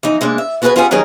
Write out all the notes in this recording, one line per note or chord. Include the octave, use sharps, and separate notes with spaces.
E3 F3 D#4
C3 G#3 A#3 D4
E5
B3 F#4 G#4 A4 B4 G#5
C#4 F4 G4 G#4 F#5 G#5
D#3 F#3 G3 D#4 G#4 A#4